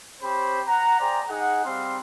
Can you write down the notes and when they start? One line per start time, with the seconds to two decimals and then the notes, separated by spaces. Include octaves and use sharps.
0.22 C4 G4 C5 C#5 B5
0.68 F#5 A#5
1.00 G#4 C5 D5 G5 A#5
1.29 D#4 G#4 F#5
1.65 G3 C4 F5 G5 C6